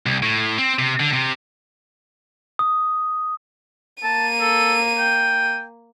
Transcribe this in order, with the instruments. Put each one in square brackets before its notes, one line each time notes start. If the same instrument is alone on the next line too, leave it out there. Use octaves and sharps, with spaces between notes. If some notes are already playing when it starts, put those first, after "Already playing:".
[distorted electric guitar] C2
A2
C4
C3
D3
C3
[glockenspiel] D#6
[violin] A#3 D#7 [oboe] A5
[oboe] A4
G5